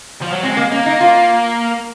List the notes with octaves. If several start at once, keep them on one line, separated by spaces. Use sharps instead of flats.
F3
F#3
G#3 C4
A#3
A#3 C#4
D#4
F4